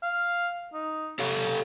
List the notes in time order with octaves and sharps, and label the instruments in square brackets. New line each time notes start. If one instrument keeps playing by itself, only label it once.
[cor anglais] F5
D#4
[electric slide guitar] G4 A4 F5 [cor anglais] C#5